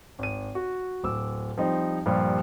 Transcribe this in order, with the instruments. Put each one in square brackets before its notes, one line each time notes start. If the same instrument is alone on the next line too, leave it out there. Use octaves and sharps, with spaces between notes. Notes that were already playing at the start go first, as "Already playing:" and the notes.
[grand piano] G#1 D#7
F#4
D1 D6 E6
F3 G3 C4 D#4
G2 A#2 F3 G3